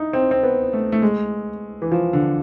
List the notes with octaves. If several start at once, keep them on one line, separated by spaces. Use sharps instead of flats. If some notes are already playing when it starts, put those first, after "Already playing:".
Already playing: D#4 E4
C4
C4
B3
A3
A3
G#3
E3
F3
D3